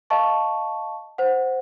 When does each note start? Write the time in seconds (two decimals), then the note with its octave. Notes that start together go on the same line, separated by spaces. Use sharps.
0.10 D#5 F5 A5 C#6
1.18 C5 F#5